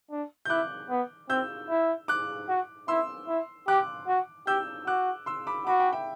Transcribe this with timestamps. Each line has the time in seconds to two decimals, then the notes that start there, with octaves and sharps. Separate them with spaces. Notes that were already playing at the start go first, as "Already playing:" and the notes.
0.11 D4
0.45 G6
0.49 E4 D6 F#6
0.90 B3
1.29 C4 E6 G6
1.69 E4
2.08 D6 F#6
2.48 F#4
2.88 E4 C6 E6
3.28 E4
3.68 G4 D6 F#6
4.07 F#4
4.47 G4 E6 G6
4.87 F#4 D6 F#6
5.26 C6 E6
5.47 B5 D6
5.67 F#4 B5 D6
5.80 G5 B5
5.93 E5 G5